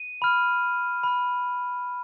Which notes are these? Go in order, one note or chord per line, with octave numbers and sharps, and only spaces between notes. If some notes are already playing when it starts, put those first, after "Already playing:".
Already playing: D#7
B5 F6
B5 F6